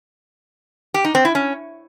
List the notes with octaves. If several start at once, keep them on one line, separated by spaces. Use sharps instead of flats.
G4
D#4
C4
E4
C#4